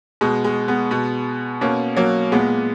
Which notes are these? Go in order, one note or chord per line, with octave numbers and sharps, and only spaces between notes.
B2 G#3
G#3
G#3 B3
B2
B2 A#3 C#4
F#3 A#3
A#2 G#3 B3